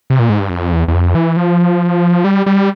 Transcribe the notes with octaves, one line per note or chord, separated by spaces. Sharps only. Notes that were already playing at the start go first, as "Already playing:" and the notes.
C3
A#2
G#2
G2
F2
E2
E2
F2
E3
F3
G3
G3